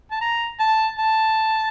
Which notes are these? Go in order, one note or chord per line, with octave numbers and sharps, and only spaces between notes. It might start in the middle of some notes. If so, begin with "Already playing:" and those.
A5
A#5
A5
A5